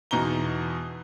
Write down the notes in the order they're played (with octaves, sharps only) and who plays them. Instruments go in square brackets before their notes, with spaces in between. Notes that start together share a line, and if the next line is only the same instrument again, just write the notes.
[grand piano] E2 B2 D#4 A#5 G7